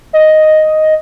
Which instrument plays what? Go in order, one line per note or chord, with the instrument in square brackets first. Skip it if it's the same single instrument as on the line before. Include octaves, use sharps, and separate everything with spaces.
[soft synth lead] D#5